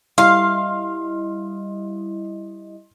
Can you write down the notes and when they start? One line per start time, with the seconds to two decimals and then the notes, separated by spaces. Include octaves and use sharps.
0.18 G3 E4 D#5 F5 C6